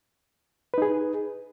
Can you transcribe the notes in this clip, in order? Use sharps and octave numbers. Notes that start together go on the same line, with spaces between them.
D#4 G#4 B4